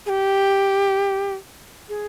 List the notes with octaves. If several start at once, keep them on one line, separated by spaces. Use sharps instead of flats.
G#4
G4
G#4